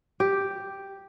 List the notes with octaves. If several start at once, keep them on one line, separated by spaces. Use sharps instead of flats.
G4